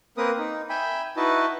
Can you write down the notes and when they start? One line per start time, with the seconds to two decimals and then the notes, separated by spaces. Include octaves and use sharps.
0.17 A#3 C4 A#4 B4 D#6
0.38 D#4
0.69 E5 G5 G#5 B5
1.17 D#4 E4 F#4 B4 D#5 A5